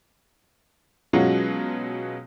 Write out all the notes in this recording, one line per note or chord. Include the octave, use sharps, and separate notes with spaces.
B2 F#3 G#3 C#4 F4 F#4